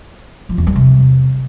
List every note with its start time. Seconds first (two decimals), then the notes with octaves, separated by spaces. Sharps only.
0.49 F3
0.58 E2
0.67 G3
0.75 C3